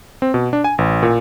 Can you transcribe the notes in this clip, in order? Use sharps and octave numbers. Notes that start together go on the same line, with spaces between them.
C4
B2
D4
G#5
A1
A#2